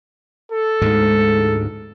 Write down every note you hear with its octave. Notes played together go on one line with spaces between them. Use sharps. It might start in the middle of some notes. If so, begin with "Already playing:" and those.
A4
D2 G#2 G#3